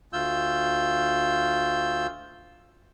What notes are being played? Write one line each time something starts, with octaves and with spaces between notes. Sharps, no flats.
D2 F4 E6 G6